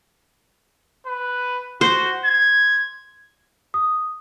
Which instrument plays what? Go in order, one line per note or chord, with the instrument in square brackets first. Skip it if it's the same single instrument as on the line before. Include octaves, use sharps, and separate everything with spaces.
[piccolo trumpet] B4
[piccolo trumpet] F#4 [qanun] C5
[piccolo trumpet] G#6
[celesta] D#6